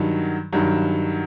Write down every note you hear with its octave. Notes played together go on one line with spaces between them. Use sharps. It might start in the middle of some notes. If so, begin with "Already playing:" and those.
Already playing: G2 D#3 F#3
G2 D#3 F#3